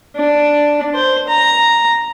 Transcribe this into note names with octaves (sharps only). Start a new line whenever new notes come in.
D4
C5
A#5